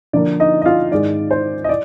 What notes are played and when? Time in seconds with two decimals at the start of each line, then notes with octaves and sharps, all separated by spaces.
0.13 D3 F3 A#3 D5
0.40 D#4 D#5
0.62 D#5
0.65 F4 F5
0.91 G#2 D#3 G#3 D5
1.31 C5
1.64 D#5
1.69 D5